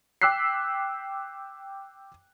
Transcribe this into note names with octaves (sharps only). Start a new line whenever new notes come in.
G5 D6 E6 F#6 B6 C7